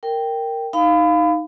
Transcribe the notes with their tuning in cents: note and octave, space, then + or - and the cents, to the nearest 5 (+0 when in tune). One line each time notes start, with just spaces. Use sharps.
A#4 -10 G5 +0
D#4 +0 F5 +0 B5 +30